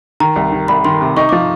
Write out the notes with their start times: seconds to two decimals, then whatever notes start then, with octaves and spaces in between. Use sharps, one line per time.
0.20 D#3 A#5
0.36 C2
0.52 D#3
0.68 C2 B5
0.85 D#3 C6
1.01 C3
1.17 D#4 C#6
1.29 F3 D6